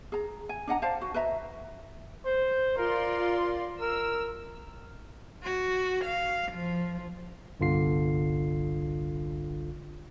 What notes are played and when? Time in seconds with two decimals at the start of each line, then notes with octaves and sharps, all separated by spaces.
0.12 G#4 A#5
0.49 G#5
0.67 D4 D#5 F#5 A#5
0.82 C5 D5 F5 A5
1.01 F#4
1.14 B4 D#5 E5 A#5
2.25 C5
2.77 F4 A#4 D5 C6
3.81 A#4 E6
5.44 F#4
6.05 F5
6.52 F3
7.60 G1 C2 D3 F4 C7